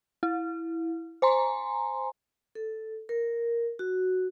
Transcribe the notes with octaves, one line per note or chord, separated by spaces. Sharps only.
E4
C5 G#5 A#5 C6
A4
A#4
F#4